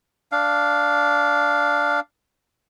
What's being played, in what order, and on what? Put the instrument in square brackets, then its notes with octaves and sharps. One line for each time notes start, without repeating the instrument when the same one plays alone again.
[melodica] D4 F5